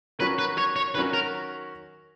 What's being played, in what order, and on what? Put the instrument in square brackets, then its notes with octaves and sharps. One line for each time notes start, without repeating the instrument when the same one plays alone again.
[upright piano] D#3 F#3 C#4 F#4 [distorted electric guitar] B4
[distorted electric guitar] B4
C#5
C#5
[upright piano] D#3 F#3 C#4 F#4 [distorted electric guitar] B4
[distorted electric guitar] A#4